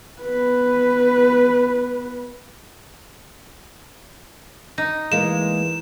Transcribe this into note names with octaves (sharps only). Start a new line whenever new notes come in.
B3 B4
D#4
E3 G#3 A#3 E7